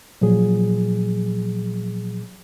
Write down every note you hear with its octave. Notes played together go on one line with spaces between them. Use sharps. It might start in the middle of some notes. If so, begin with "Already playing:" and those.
A#2 F3 F#3 G#4